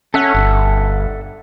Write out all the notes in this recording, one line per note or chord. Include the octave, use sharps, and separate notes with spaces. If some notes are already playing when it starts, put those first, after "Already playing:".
C#4 A4 E5 F#5
G1